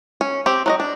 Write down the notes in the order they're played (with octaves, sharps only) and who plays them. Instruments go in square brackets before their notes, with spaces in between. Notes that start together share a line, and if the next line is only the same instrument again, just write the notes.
[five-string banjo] C#4
C4 G4
F#3 F#4 D#5
D4